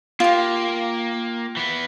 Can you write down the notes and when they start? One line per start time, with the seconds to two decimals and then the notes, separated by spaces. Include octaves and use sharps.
0.20 A#3 F4 G4
1.57 E3 B3